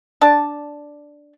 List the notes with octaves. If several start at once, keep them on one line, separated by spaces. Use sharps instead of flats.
D4 D5 A5